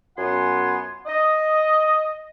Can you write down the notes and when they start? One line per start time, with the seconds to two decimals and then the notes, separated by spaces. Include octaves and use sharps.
0.17 F#2 B3 F4 F#5 G#5 C6
1.07 D#5